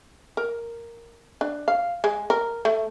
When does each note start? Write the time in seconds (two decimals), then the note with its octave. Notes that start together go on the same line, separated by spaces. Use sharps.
0.37 A#4
1.41 D4
1.68 F5
2.04 G#3
2.30 A#4
2.65 A3